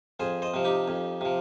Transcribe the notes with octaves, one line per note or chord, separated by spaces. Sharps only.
F2 G#4 C5
C5 D#5
C3 F3
D#4 G4
F2
C3 F3